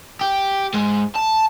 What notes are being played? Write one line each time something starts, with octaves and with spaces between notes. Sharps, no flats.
G4
G#2 G#3
A5